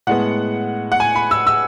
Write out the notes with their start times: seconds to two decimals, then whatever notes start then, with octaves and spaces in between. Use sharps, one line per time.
0.07 A2 G#3 B3 F#5
0.92 F#5
1.00 G#5
1.16 B5
1.31 E6
1.47 E6